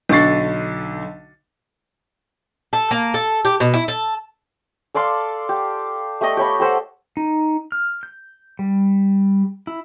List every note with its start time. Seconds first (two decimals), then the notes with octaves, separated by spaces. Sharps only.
0.09 B1 D3 C#6 A6 C7
2.73 A4
2.91 A#3
3.14 A4
3.45 G4
3.60 B2
3.74 E4
3.88 A4
4.95 A4 D5 F5 C6
5.49 G4
6.21 A3 G4 D5 D#5
6.37 G4 C#5 B5
6.59 G4 A4 C5 F#5
7.17 D#4
7.72 F6
8.03 G6
8.59 G3
9.67 E4